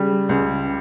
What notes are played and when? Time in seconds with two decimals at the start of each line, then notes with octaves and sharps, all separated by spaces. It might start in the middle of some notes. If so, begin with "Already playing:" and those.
Already playing: C#3 G3
0.29 C#2